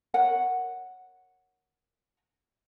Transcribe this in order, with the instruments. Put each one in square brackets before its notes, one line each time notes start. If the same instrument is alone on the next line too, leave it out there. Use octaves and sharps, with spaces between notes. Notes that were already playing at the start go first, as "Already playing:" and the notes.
[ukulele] A#4 C#5 F#5